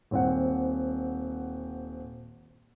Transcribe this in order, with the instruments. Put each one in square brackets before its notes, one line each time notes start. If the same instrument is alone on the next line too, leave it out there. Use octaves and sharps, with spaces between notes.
[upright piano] D#1 C4 F#5